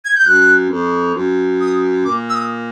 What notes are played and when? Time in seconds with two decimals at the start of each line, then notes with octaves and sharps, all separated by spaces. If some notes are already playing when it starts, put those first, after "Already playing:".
0.05 G#6
0.16 G6
0.26 F#2 F#6
0.70 F2
1.15 F#2
1.60 D#6
2.05 A#2 D6
2.29 E6
2.35 D#6